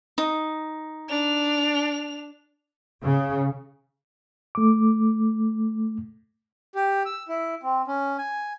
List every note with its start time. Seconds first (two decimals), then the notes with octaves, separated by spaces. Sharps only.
0.18 D#4
1.09 D4 F7
3.02 C#3
4.55 A3 D6
6.75 G4
7.06 E6
7.29 E4
7.63 C4
7.87 C#4
8.18 G#5